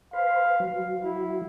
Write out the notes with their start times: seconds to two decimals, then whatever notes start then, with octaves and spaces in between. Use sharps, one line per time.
0.13 B4 C5 F5
0.60 F#3
1.03 E4